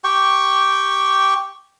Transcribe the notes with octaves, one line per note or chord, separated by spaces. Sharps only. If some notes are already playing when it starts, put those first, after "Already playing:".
G4 G5 C#6